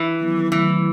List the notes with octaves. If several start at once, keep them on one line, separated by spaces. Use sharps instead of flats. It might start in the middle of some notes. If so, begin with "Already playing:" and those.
Already playing: E3
D#3 F#3 B3 E4
D#3 E3 F#3 A3 E4